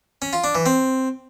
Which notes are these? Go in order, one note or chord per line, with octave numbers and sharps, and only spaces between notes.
C#4
F4
D4
E3
C4